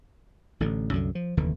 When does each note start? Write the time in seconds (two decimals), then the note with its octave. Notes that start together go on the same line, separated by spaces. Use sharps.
0.60 A1 A2 D3
0.92 C2 F#2 D3
1.15 F3
1.37 F1 D#2 D3 E3